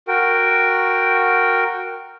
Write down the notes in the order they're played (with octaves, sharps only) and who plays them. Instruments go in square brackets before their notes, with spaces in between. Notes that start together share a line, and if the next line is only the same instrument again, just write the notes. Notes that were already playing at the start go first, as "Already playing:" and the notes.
[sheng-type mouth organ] F#4 A#4 G5